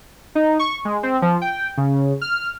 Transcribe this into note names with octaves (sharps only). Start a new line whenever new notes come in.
D#4
C#6
G#3
C4
F3
G5
C#3
F6